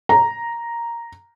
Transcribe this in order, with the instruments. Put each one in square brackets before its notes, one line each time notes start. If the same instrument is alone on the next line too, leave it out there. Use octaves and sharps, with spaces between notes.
[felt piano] A#5